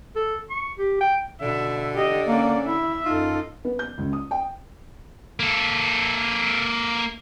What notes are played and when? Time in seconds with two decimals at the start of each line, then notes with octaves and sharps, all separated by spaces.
0.16 A4
0.50 C#6
0.78 G4
1.01 G5
1.42 B2 D3 E5
1.94 G4 D#5
2.28 A#3 C#4 D5
2.67 E4 E5
3.05 F#2 D#4 F4 A4
3.65 B3
3.79 G6
3.98 C#2
4.13 D#6
4.31 G5
5.40 A#3 A4